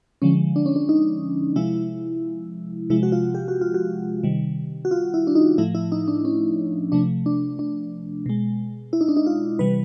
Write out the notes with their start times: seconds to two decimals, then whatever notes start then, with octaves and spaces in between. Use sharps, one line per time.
0.22 D3 F3 G#3 C#4
0.56 D4
0.66 C#4
0.76 D4
0.89 D#4
1.56 C3 F3 G#3 E4
2.90 C3 F3 G#3 E4
3.03 F#4
3.12 F4
3.35 G4
3.48 F#4
3.61 F4
3.74 F#4
4.24 C3 D#3 G3
4.85 F#4
4.91 F4
5.14 E4
5.27 D4
5.35 D#4
5.58 A2 F3 A3 E4
5.75 E4
5.92 D#4
6.08 D4
6.25 C#4
6.92 C3 F3 A3 D4
7.26 D4
7.59 D4
8.26 B2 G#3
8.93 E4
9.01 D#4
9.08 D4
9.17 D#4
9.27 F4
9.59 C3 E3 G3 B4